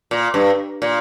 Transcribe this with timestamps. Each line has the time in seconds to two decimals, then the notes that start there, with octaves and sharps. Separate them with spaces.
0.11 A#2
0.34 G2
0.82 A#2